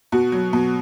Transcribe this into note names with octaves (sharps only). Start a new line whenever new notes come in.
B2 F#4
F#3
B2